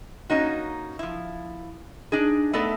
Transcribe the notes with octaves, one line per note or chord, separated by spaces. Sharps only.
A#3 C#4 D#4 F#4
F3 E4
D4 D#4 G#4
A3 B3 D#4 A4 D5 E5